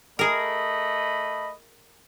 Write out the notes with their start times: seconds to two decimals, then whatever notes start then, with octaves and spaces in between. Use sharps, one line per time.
0.19 A3 G#4 A#4 D#5 B5